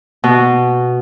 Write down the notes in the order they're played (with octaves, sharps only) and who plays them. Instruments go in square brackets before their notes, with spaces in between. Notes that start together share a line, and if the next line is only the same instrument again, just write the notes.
[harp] B2